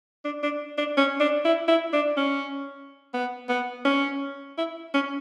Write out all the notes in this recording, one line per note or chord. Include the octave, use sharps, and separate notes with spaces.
D4
D4
D4
C#4
D4
E4
E4
D4
C#4
B3
B3
C#4
E4
C#4